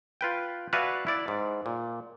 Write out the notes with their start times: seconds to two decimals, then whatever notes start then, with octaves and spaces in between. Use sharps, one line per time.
0.21 F4 B4 G5
0.73 F#4 B4 D5 E5 F5 G#5
1.07 E4 D5
1.28 G#2
1.66 A#2